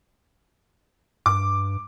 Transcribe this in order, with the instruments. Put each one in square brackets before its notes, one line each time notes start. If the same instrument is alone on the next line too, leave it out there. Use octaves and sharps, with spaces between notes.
[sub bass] G2 [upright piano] D6